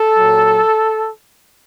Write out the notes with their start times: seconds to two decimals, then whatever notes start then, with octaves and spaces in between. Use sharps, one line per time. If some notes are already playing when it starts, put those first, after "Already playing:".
Already playing: A4
0.16 A#2 F#3